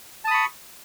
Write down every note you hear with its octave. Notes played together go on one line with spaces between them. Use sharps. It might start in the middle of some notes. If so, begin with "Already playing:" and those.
A5 B5 C#6 D#6